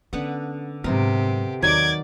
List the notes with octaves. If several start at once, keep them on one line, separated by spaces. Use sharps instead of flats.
D3 B3 C#4 F#5
G#2 C3 F#3 B3 G4 A#4
D#2 D#3 F#3 D5 D6 G#6